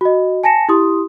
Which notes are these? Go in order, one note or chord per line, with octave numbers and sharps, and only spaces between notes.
F#4 D#5
G#5 A5 A#6 C#7 E7
E4 G4 C6 D#6